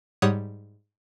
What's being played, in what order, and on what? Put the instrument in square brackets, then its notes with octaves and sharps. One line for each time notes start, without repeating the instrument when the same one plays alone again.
[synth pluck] G#2 G3 C#5 F#5 D#6